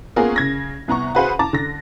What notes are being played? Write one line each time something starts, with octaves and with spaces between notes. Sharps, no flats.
A#3 B3 C#4 F4 G#4 A#4
C#3 G#6 A#6
C2 B3 A#5 C#6
F#4 G#4 B4 C5 F5 F#5
A5 A#5 D6 A6
D3 A#6